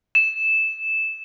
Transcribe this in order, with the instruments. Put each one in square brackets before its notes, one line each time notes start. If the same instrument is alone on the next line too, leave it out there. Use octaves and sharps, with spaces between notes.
[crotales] E7